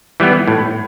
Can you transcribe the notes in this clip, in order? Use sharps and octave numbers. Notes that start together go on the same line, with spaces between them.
E3 G3 B3
A2